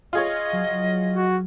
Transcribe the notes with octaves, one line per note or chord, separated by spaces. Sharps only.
F4 G#4 C#5 D#5
F#3
F#4